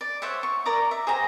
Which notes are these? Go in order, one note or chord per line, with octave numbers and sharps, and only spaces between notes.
D5
C5 C#5 E5 F#5
C#6
A#4 D5 A#5 D6
E5
G#4 C5 G5 A#5